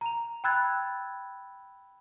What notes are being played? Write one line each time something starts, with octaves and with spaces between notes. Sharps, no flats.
A#5 F7
G5 B5 E6 F#6 G#6 A6